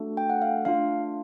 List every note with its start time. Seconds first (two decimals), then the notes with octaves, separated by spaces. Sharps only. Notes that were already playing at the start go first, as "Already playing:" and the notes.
Already playing: A3 D4 F#4 A4
0.17 G5
0.30 F#5
0.42 F5
0.65 A3 D4 F4 F5